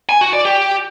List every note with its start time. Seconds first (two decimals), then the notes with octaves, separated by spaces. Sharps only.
0.09 G#5
0.21 F#4
0.33 D5
0.45 G4